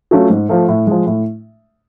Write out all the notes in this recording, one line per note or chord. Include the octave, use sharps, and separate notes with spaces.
F#3 A3 C#4 F4
G#2
F3 A3
A2
F3 G#3
A2